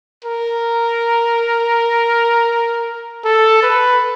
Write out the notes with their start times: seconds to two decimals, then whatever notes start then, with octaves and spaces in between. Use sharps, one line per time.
0.25 A#4
3.25 A4
3.63 B4